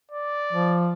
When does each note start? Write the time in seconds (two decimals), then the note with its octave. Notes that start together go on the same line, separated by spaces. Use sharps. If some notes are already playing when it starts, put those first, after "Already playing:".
0.11 D5
0.53 F3